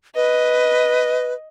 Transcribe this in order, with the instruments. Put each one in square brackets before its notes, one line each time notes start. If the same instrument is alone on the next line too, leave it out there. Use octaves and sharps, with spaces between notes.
[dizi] B4 [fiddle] D#5